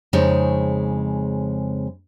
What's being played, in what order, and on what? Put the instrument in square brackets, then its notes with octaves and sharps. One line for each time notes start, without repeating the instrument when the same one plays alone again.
[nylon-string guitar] F2 C#3 G#3 D#4 C#5